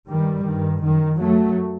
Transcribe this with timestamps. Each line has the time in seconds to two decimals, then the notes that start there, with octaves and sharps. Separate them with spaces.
0.09 G2 D#3 G3
0.45 G2 D#3
0.82 F#2 D#3
1.20 F#2 F#3 A3